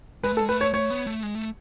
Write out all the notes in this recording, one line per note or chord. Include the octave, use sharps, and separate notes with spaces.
G#3 B4
A3
A4
G#3
A3 B4
C#5
A3 C#5
B3
A3
G#3
A3